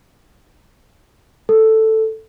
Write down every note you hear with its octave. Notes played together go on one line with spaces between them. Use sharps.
A4